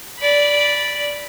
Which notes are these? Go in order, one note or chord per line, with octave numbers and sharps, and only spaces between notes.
D5 B5